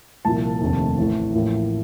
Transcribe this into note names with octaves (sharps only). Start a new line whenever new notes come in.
C2 A#2 F3 A5
F1 D#2 D3 A3 C4
A1 A2 A3
A1 A2 F3 A#3